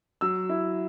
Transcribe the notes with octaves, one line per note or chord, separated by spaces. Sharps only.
F#3 E6
E4